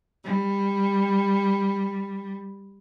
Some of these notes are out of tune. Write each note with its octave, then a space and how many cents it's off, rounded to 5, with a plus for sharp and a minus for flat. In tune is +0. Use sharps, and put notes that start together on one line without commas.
G3 +15